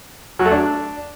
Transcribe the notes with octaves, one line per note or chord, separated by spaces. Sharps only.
F#3
A3
D4